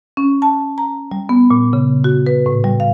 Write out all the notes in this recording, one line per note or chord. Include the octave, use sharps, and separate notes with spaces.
C#4
A5
A#5
G3
B3
A#2
C#3
F#4
B4
A2
G3
F5